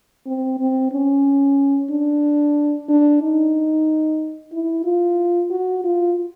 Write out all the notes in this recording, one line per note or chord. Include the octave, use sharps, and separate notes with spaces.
C4
C4
C#4
D4
D4
D#4
E4
F4
F#4
F4